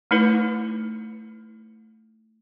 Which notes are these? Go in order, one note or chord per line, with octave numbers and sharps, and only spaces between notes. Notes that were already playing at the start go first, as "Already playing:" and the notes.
A3 D#4 E4 B4